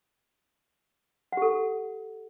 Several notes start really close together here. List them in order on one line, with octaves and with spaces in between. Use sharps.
F#5 G4 A4